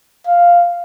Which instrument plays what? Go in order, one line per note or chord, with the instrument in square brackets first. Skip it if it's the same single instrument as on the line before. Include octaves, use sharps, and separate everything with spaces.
[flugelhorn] F5